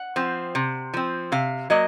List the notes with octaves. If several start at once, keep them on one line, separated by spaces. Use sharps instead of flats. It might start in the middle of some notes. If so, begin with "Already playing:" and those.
Already playing: F#5
F3 C4
C3
F3 C4
C3 F5
F#3 A#3 D#5